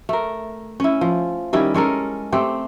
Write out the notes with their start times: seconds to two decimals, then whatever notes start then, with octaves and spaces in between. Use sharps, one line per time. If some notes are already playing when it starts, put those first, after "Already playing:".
0.09 A3 A#4
0.80 C#4 E4
1.01 F3
1.53 D#3 G3 C#4 E4
1.74 G#3 C#4 A4 A#4
2.32 A3 C4 G4